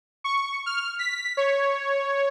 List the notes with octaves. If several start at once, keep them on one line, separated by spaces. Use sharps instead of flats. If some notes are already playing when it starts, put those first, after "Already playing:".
C#6
F6
B6
C#5